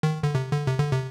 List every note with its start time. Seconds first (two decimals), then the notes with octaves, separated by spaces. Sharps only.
0.03 D#3
0.23 D3
0.35 C3
0.52 D3
0.67 C3
0.80 D3
0.92 C3